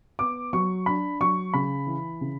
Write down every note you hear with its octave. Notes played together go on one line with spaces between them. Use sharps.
B3 D6
F#3 C#6
D4 B5
F#3 C#6
C#3 B5
E3
C#3